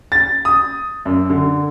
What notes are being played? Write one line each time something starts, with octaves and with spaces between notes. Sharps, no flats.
A6
D#6
F#2
D3